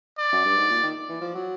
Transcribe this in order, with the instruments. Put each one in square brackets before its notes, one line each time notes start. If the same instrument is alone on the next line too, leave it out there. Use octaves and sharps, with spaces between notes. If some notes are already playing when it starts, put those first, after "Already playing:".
[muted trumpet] D5
[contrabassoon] F#2
G2
G#2
A#2
D#3
E3
F3
F#3